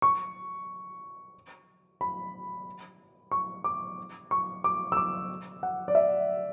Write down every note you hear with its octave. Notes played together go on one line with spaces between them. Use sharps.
C#6
B5
C#6
D6
C#6
D6
E6
D6
F#5
D5
E5